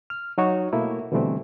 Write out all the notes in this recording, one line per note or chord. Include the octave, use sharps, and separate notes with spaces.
F6
F#3 D#4 F#4 C#5
B2 A3 A#3 E4
B2 D3 E3 G3 A3 C4